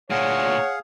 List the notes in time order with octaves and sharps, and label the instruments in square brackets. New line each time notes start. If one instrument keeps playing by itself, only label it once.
[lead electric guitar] D2 A#2 [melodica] G#4 F5 [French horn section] C#5 [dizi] F#5